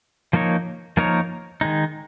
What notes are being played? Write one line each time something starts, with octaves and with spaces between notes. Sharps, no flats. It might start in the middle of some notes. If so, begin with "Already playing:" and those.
F3 A#3 D#4 A#4 C#5
F3 A#3 D#4 A#4 C#5
D#3 G#3 D#4